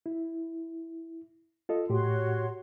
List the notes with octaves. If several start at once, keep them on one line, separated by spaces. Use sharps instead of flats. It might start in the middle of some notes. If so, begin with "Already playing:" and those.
E4
F4 A4 D#5
A2 F#4 G4 C#5 C6